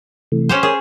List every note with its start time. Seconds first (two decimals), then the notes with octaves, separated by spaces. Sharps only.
0.32 C3 E3 A3
0.49 C#4 G4 C5
0.63 G#4 A#4 C#5 C6